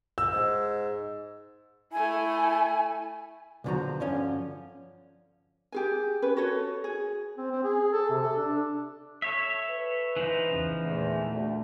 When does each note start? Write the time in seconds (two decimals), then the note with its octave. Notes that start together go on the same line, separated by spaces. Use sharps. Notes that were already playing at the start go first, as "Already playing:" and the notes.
0.18 E6
0.32 G#2
1.92 A3 E4 G#5
3.64 B1 E2 D3 F3 F#4 A#5
4.00 G2 D3 F3 C#4
5.72 G4 G#4 G#5
6.22 C#4 B4
6.37 F#4 A4 C#5
6.84 G#4
7.38 C4
7.52 C4
7.64 G#4
7.93 A4
8.10 C3
8.22 A4
8.37 D4
9.22 A4 C#5 E5
9.71 B4
10.16 E3 F3 D#4
10.49 E2 C#3
10.84 E2 A#2 A3
11.32 D2